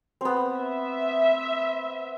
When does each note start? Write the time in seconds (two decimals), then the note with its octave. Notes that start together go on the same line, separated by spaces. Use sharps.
0.21 B3 C4
0.55 E5